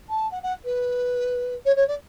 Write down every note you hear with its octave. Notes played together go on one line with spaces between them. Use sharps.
A5
F#5
F#5
B4
C#5
C#5
D5